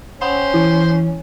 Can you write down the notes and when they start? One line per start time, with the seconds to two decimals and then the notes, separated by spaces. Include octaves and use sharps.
0.21 C#4 C5 F#5 G5 B5
0.54 E3 E4